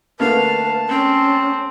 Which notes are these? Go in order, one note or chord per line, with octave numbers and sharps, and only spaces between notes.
D3 A3 A#3 B4 F5 A5
C4 C#4